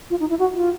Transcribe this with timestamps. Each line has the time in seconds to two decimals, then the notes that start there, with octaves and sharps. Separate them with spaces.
0.10 F4
0.20 D#4
0.30 E4
0.39 F#4
0.56 F4